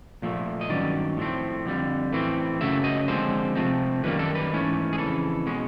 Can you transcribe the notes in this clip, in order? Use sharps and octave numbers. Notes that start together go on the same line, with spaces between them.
A#2 F3 A3
D#5
G2 D#3 F#3 C#4 D5
A2 F3 A3 C4
F2 D3 G3
A2 E3 A3 C4
F#2 C#3 F#3 A3 E5
D#5
D3 F3 G#3 C4 C5
C3 F3 A3 C4
F#2 D#3 G3 A#3 B4
A4
B4
G#2 E3 A3 C#4
G#4
F2 C#3 E3 A4
B2 G#3 C#4